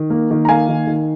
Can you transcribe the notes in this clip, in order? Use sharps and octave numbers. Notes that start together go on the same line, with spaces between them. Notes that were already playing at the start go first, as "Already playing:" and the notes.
Already playing: D#3
A#3
D#3
A#5
A#3 F5 G#5
D#3
D#3